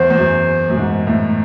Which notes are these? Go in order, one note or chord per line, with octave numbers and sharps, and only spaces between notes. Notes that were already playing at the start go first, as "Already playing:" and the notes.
Already playing: E2 C5
E2
F#2
F#2
G#2
A2